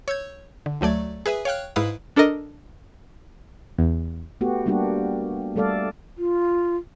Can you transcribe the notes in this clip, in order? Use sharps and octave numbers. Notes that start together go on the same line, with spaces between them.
C#5 E6 G6 G#6
D3
D2 F#3 A3 D5 G#6
G#4 B4 E5 G#5
C#5 F5 G5 F6 F#6
G#2 E4 B4 F5 D#6
D4 A4 A#4 D#5
E2
A3 B3 F#4 G4
G3 A#3 D4 F#4 G4
G3 A3 A4 D5 F5
F4